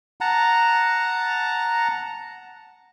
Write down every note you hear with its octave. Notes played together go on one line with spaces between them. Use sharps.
F#5 A5 A#5